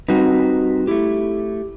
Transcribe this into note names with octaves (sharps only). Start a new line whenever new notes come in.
G3 C4 D#4 F#4 B4
A3 E4 G4